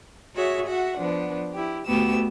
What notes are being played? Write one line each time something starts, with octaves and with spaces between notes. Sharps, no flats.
F#4 G#4 C#5 E5
F#4 E5 F#5
F3 B3 D4
E4 G4
D2 A3 B3 F#4 G4 E6